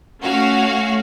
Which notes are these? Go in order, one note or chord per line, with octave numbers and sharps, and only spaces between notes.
A3 C#4 F#4 F5